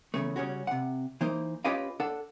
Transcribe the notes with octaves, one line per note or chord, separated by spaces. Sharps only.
E2 A2 C#3 A3
C#3 G3 C#4 F#4
C3 F#5
E3 A#3 D#4 C5
C#4 F4 G4 B4 D#5 F5
D4 A4 F#5